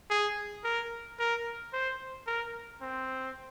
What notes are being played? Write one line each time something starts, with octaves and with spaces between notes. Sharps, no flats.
G#4
A#4
A#4
C5
A#4
C4